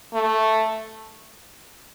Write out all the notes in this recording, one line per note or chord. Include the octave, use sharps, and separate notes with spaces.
A3